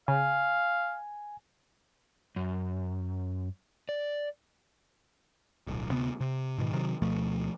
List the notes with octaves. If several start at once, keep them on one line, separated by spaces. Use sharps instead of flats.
C#3 F5 G#5
F#2
D5
D1 B1
D2 C3 B3
C3
G#2 B2 D#3
C3 D#3 F#3
D2 B2 F3 A3